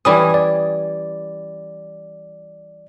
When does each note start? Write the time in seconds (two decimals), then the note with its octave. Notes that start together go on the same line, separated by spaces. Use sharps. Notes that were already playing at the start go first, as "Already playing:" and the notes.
0.05 E3 G3 C#4 D#6
0.34 D5